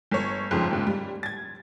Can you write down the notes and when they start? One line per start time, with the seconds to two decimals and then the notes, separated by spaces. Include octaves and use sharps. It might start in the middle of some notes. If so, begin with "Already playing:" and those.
0.11 G1 C#5
0.51 G1 F2 G#2 C#3 C6
0.71 D#2 G#2 C#3
0.87 G3
1.23 G#6 A6